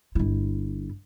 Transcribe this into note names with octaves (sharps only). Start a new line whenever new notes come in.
G1 E4